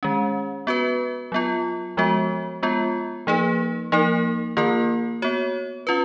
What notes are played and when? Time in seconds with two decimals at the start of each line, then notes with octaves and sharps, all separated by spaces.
0.03 D#3 G#3 C#4
0.67 B3 F#4 B4
1.32 F#3 B3 F4
1.97 F3 G#3 B3 F#4
2.63 G#3 B3 F4
3.27 F3 A#3 D#4 G#4 B4
3.92 F3 A#3 D#4 A#4
4.57 D#3 A#3 F4 A#4
5.22 B3 F#4 C#5
5.87 C#4 F4 B4